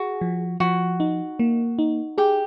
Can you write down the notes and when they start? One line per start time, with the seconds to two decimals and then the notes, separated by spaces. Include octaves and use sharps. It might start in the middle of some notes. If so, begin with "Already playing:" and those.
Already playing: F#4 G#4
0.21 F3
0.60 F3 F#4
1.00 D#4
1.39 A#3
1.79 D#4
2.18 G4 G#4